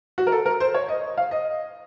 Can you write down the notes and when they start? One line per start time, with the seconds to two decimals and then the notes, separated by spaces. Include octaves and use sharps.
0.18 F#4
0.27 A#4
0.32 A4
0.46 A#4
0.60 C5
0.74 C#5
0.88 D#5
1.17 F5
1.31 D#5